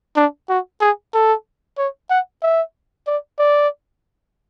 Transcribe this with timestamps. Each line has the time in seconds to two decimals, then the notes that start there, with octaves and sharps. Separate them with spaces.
0.16 D4
0.49 F#4
0.81 G#4
1.13 A4
1.78 C#5
2.10 F#5
2.42 E5
3.07 D5
3.39 D5